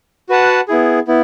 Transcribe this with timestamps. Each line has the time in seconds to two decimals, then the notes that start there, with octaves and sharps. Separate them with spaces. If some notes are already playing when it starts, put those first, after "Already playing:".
0.29 F#4 B4 F#5 A5
0.68 B3 E4 G#4
1.08 B3 E4